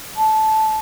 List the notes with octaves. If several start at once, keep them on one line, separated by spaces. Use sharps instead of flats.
A5